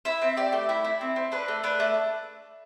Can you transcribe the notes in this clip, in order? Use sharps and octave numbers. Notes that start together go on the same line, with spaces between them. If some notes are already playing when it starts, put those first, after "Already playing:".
E4 E5
C4
G4 D5
A3
E4
E4
C4
C4
D4 B4
A3
D4 B4
A3